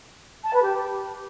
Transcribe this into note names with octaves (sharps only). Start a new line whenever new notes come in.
A5
B4
G4